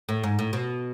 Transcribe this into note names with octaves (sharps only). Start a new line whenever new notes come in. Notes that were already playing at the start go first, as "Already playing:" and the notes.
A2
G#2
A2
B2